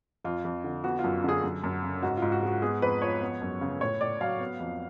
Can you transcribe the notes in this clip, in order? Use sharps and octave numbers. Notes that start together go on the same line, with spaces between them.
F2 F4
F2
D3
B3 F#4
F4
F#2
D3 G#4
F#2
F#2
C#3
G#2 F#4
F4
G#2
F#4
G#3 F#4
B3 G#4
F2 B4
F3 C#5
B3
F#2
C#3
A2 C#5
A2 D5
F#3 F5
B3
F2